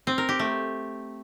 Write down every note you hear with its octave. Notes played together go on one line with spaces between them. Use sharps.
C4
A#4
G4
A3